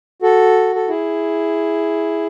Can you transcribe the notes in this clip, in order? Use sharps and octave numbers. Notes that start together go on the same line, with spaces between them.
F#4 A4
A4
E4 G#4